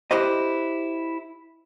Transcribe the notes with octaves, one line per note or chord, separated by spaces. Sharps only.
E4 G4 B4 C5 D#5